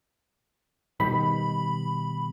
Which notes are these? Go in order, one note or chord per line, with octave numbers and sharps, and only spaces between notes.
B2 D#3 G3 B5